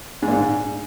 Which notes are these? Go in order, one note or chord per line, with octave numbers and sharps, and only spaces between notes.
G#2
A#2
G#2